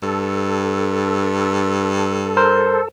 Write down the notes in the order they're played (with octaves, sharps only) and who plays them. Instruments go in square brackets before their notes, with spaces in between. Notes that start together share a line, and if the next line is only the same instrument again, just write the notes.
[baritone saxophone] G2 [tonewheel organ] A4
[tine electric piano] A#4 C5